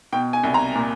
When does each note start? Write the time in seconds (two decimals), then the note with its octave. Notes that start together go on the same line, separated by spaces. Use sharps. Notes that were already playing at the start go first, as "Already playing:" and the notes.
0.13 B2 G5
0.33 G#5
0.43 C2
0.54 A#5
0.75 A#2